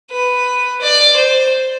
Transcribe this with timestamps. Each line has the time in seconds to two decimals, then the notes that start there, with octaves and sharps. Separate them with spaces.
0.10 B4
0.80 D5
1.16 C5